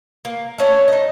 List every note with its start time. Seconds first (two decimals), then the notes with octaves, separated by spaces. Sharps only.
0.25 A#3
0.58 A3 C#4 D4
0.88 D#4 D#5